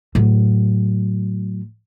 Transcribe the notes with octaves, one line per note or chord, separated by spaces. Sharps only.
A2 F#3